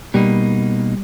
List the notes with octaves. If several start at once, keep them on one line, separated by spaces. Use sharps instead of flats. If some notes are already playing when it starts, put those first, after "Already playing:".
B2 G3 A#3 D#4